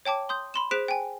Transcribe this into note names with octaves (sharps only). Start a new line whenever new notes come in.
C#5 G5 A5 D6
C6 D#6 G6
B5 C6 E7
G#4 C5 F#6 B6 D7 E7
G5 G#5